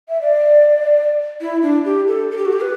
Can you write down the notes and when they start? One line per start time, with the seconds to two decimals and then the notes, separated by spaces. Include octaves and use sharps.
0.09 E5
0.21 D5
1.41 E4
1.62 D4
1.85 G4
2.08 A4
2.31 A4
2.37 G4
2.45 F#4
2.53 G4
2.61 B4